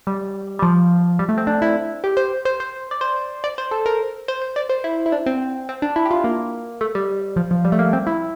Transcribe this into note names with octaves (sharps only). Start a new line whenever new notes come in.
G3
G3
F3
G3
A3
C4
D4
E4
G4
C5
C5
C5
D5
C5
D5
C5
A4
A#4
C5
C5
D5
C5
E4
E4
D4
C4
C4
D4
E4
G4
F4
A#3
A3
G3
F3
F3
G3
A3
A#3
C4
E4